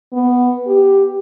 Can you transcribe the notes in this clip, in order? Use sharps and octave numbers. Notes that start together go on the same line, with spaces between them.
B3
G4